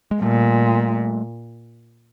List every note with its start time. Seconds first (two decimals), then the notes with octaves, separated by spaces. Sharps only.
0.11 G#3
0.22 A#2 G3 A3